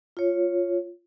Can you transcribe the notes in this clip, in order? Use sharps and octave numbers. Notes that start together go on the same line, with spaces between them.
F4 C#5